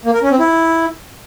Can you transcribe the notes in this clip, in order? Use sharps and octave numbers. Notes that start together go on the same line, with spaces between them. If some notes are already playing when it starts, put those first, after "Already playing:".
A#3
A#4
C#4
C4
E4